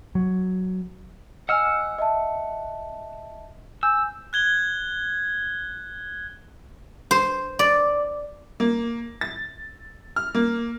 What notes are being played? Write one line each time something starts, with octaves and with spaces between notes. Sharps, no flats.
F#3
D#5 F#5 G#5 E6 F6
D#5 E5 A5
G#5 E6 G6
F#6 G#6 G7
C5
D5
A#3
A6
F6
A#3